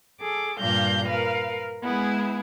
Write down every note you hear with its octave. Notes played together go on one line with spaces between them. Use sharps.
G#4 A4 D6
G2 A#2 G3 F5 G6 A#6
A#4 B4 F5
G#3 B3 E4 G#4